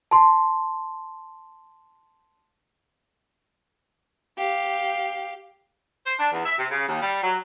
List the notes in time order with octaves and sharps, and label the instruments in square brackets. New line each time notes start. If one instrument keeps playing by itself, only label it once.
[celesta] A5 C6
[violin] G4 F5
[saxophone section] C5
D4
E2
E5
C3
C#3
D#2
G3
F#3